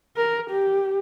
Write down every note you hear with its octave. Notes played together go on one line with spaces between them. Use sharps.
A#4
G4